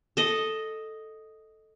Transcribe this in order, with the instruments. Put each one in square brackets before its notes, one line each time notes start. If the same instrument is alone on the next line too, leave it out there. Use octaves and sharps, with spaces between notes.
[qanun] A4 D#5